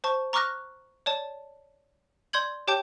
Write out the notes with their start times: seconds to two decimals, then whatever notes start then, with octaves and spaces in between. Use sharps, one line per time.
0.04 C5 A5 C#6
0.33 A#5 C#6 D6 F6 F#6 A#6
1.06 C#5 D5 A5
2.33 D5 C6 G6 G#6 F#7
2.67 G4 C#5 G5 A5 D6 G6